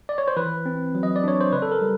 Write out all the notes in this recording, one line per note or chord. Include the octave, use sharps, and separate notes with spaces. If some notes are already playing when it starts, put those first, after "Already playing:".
D5
C#5
C5
E3 B4
C4
F#3
D#5
D5
D4 C#5
C5
C#3 B4
A4
A#4
G3